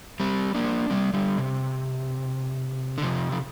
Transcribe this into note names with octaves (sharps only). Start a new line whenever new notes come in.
G3 C4
A#3 D4
G3 C4
D3 G3
C3
D3
C3 F3
F3